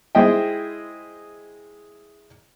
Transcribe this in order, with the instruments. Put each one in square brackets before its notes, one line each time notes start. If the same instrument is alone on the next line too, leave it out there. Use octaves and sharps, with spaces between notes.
[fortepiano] G#3 E4 C5 D#5 E5 G5